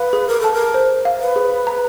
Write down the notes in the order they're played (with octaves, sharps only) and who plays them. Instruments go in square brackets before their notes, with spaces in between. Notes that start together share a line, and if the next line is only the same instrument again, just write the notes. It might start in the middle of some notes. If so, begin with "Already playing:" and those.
Already playing: [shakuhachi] B4 [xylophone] F5
[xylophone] G#4
[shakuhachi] A#4
[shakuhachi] A4 [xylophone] A5
[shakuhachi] A#4
[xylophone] C5
F5
[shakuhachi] B4
[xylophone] G#4
A#5